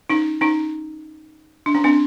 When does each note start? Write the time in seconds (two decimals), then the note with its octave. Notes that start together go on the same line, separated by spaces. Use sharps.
0.09 C#4 D#4
0.41 C#4 D#4
1.66 D4
1.75 C#4
1.84 C4 D4